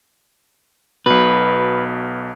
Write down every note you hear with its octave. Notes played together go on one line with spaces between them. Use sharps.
B1 B2 B4